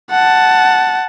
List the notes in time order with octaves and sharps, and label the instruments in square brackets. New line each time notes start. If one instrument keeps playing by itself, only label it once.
[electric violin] F#5 A5